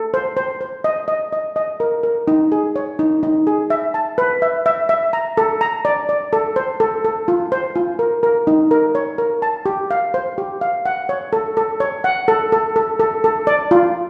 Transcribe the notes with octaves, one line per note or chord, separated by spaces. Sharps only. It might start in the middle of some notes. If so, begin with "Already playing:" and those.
Already playing: A4
C5
C5
C5
D#5
D#5
D#5
D#5
A#4
A#4
D#4
G#4
C#5
D#4
D#4
G#4
E5
A5
B4
E5
E5
E5
A#5
A4
A#5
D5
D5
A4
C5
A4
A4
F4
C5
F4
A#4
A#4
D#4
A#4
C#5
A#4
A5
G4
F5
C5
G4
F5
F#5
C#5
A4
A4
C#5
F#5
A4
A4
A4
A4
A4
D5
F4